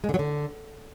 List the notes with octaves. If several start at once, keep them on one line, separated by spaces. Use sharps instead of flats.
G#3
D3
F#3
D3